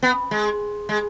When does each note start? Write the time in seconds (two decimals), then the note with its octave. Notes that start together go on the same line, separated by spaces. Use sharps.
0.03 B3
0.31 G#3
0.89 G#3